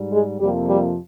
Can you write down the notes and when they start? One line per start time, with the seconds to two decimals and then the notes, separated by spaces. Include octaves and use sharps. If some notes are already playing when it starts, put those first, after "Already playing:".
Already playing: G#2 G3
0.11 G#3 G#4
0.39 F2 C3 F3 G3 A#3 G4
0.68 G3 G4